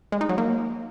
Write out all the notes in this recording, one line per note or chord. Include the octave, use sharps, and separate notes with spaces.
G#3
D#4
F#3
A#3